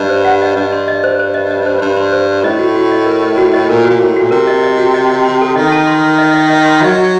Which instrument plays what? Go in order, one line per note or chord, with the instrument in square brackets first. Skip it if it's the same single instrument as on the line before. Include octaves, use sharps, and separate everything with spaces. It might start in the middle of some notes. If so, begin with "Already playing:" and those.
Already playing: [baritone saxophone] G2 [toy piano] D#5
[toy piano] C5
F#5
D#5
[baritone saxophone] G2 [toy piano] D#5
[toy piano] C6
D#5
C5
C5
D#5
D#5
C5
[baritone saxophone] G2 [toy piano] C6
[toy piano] C6
C5
C6
[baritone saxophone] A2 [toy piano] D#5
[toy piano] F#4
F#4
D#5
A#4
D#5
F#4
D#5
[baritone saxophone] A#2 [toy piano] A#4
[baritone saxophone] A#2 [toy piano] F#4
[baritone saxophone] A2 [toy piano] F#4
[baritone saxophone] A#2 [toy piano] F#4
[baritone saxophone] C3 [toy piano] A#4
[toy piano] D#5
D#5
F#4
D#5
D#5
C6
A4
[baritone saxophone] D#3 [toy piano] D#5
[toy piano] A5
C6
C6
D#5
D#5
D#5
C6
[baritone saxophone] F#3 [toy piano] D#5
[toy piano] D#5